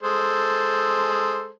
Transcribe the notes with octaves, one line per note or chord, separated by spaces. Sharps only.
G#3 A4 C5